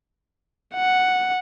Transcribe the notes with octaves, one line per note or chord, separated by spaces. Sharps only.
F#5